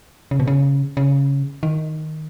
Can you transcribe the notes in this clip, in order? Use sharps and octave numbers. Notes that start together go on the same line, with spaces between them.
C#3
B2
C#3
C#3
D#3